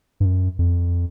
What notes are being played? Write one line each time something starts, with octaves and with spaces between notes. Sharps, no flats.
G2
F#2
F2